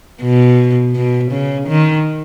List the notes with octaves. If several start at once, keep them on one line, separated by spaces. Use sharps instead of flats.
B2
B2
C#3
D#3